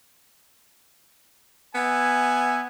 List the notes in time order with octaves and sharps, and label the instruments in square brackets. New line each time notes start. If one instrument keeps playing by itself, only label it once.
[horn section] B3 E5 G#5